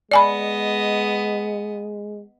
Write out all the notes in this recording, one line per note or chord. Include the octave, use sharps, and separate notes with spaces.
G#3 B3 D5 D#5 G#5 B5